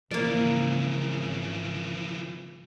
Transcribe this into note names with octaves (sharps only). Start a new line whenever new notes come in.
G#1 C#3 E3 F3 A#3 D5